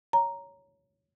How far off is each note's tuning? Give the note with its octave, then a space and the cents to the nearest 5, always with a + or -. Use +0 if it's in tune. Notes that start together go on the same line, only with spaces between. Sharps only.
C#5 +10 A#5 +0